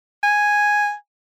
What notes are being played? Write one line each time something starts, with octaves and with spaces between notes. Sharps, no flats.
G#5